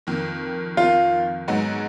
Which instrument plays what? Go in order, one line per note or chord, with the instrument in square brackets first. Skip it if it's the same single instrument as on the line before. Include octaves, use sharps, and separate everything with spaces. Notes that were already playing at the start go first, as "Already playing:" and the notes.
[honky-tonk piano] F2 D#3 A#3
[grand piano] F4
[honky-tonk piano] G#2 F#3 B3 D#4 F#4